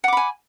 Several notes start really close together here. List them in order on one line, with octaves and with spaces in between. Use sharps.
F#5 D6 B5 G#5